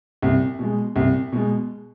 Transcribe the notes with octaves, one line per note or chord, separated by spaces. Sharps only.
C2
B2 G#3
C2
B2 G#3